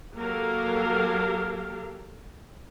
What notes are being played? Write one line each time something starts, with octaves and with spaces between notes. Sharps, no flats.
F#3 A#3 G4 A4 A#4 F5